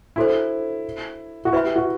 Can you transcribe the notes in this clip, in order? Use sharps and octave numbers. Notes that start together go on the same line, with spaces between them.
D4 E4 F#4 A4 C5
F#4
E4 B4 E5 G5 B5
G4
F#4